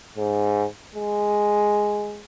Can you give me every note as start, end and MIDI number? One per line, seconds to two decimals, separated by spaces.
0.17 0.66 44
0.95 2.25 56